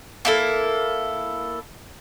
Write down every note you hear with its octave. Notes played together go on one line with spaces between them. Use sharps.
A#3 E4 A4